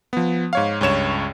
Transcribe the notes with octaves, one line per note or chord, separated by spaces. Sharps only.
F3 B3
G#2 C#5 F5
C#2 G2 C#5 E7